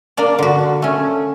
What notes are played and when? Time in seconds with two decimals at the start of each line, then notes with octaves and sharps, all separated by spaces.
0.17 A#3 D4 D5
0.39 D3 F#4
0.82 A3 C#4